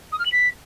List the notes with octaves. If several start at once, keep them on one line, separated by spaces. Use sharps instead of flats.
D#6
F6
F#7
B6